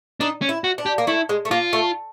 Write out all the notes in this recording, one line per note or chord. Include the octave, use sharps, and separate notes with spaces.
D4 D#4
C#4
E4
F#4
D4
G4
A#3
A3 E4
G#3
A3
A#3 F4
A3